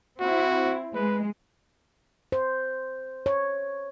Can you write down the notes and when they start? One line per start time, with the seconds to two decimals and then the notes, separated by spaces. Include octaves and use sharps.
0.20 C4 E4 F#4
0.94 G#3 B4
2.32 C5
3.26 C#5